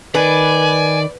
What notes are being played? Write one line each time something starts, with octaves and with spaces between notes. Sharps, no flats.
D#3 B4 D5 G#5